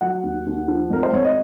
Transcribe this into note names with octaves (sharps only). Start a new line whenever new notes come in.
F#3 F#5
D#2
D#2
F3
G#1 A#4
C5
G#1 C#5
D#5